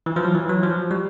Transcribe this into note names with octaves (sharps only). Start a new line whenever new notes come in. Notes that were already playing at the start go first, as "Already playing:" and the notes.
E3
F3
F#3
E3
F#3
F3
G3